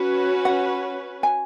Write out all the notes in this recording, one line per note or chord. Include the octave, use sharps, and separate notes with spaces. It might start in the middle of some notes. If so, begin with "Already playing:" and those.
Already playing: C#4 F#4 B4
F#5
G#5